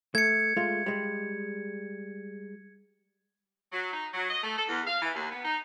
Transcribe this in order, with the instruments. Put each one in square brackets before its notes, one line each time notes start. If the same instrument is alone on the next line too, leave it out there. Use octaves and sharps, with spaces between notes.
[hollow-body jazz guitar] A3 [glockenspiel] G#6 C#7
[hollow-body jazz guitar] G#3 A3 F4
G3 G#3
[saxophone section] F#3
D#4
F#3
D#5
A3
A4
E2
F5
E3
D#2
B3
D#4